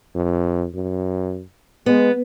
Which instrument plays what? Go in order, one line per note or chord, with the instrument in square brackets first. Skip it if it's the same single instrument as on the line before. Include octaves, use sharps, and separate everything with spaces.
[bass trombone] F2
F#2
[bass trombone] G#3 [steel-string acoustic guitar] B3